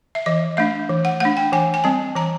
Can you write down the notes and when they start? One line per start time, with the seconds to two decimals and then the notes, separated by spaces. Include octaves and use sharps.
0.15 E5
0.26 E3 D#5
0.57 A3 D4 E5
0.89 E3
1.05 F#5
1.20 A3 D4 F#5
1.37 G5
1.53 E3 G#5
1.74 G#5
1.84 G3 C4 A5
2.16 E3 A#5